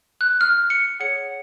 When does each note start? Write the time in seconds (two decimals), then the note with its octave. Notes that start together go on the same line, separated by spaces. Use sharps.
0.21 F#6
0.41 F6
0.70 C#7
1.00 G#4 C#5 F#5 C#7